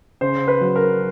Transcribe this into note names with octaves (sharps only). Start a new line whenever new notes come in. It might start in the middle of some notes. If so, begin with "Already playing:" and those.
C#3 C5
B4
F#3
A#4